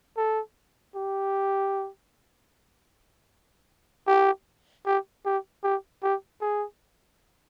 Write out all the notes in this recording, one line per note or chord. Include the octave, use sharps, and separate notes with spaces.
A4
G4
G4
G4
G4
G4
G4
G#4